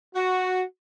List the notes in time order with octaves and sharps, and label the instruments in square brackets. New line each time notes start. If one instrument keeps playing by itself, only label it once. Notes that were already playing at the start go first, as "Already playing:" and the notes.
[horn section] F#4